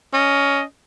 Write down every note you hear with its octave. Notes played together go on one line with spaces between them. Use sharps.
C#4 D#5